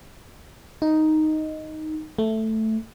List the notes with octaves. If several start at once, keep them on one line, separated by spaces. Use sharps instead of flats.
D#4
A3